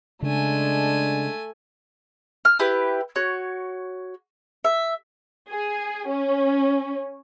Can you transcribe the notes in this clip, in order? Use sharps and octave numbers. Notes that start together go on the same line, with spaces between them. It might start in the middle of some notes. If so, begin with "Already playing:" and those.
C#3 G#3 A3 D4 G#5
F6
E4 G4 B4
F#4 C#5
E5
G#4
C#4